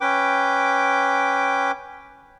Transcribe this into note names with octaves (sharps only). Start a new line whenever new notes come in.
C#4 B4 G5 D6